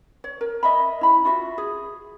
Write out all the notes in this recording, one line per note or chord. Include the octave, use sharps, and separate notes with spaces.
C#5
A#4
D#5 E5 B5
E4 B5
F4 F#4 E5
G#4